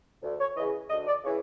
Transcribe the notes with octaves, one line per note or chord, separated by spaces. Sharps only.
D2
C#5
C#3 E3 D#5
D2 D#5
D5
C#3 E3 C#5